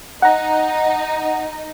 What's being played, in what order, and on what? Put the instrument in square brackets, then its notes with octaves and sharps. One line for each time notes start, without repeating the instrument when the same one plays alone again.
[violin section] D#4 [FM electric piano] F#5 A#5